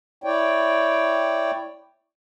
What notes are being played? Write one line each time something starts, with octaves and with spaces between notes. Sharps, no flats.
E4 C#5 D5 G5